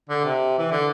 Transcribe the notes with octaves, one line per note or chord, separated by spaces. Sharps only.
D3
C3
E3
D3